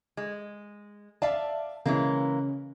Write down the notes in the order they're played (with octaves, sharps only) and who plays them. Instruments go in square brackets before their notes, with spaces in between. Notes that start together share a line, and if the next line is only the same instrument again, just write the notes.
[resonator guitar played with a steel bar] G#3
[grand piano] D5 [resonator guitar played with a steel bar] E5 F5 A5
[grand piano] C#3 C#4 [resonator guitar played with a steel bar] E3 G#3 A#3